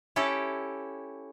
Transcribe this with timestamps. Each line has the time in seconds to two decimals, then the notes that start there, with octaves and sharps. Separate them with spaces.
0.16 C#4 E4 G4 A4